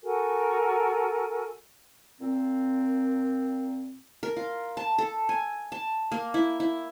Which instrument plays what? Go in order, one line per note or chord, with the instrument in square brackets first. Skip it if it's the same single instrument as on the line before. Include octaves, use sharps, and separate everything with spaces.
[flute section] F#4 A4 A#4 G#5
[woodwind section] A#2 C4
[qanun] A#4
F4
A5
A4
G#5
A5
A#3
E4
E4